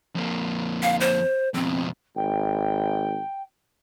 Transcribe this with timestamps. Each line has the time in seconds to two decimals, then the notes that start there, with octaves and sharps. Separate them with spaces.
0.15 F2 A#3
0.82 F5
1.00 C5
1.54 F2 B2 C4
2.16 G#1 G5